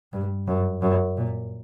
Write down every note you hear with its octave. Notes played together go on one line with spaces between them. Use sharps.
G2
F#2
F#2
A#2